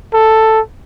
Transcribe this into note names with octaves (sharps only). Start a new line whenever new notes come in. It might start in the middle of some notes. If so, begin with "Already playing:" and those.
A4